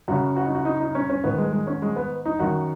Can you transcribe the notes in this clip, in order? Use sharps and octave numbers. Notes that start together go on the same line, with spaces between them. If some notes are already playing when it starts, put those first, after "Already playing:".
F#2 C#3 F#4
F#4
D#4
F#4
D#4
D#4
C#4
C#4
G#2 D#3 B3
G#3
G#3
C#4
G#3
B3
D#4
F#2 D#3 F#4